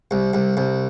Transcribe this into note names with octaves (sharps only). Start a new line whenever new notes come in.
C2
C2
C2